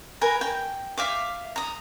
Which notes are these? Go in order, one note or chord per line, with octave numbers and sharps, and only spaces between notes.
A#4 B4 G#5 A#5
G5
E5 F5 D6
A#5 D#6